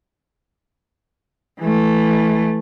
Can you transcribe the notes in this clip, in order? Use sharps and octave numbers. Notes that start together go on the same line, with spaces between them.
E3 A3